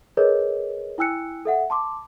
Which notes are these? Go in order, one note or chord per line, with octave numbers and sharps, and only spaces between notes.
G#4 A#4 B4 C#5 D#5
E4 G5 G#5 E6 F#6 C#7
A4 E5 F#5
A5 C6 D6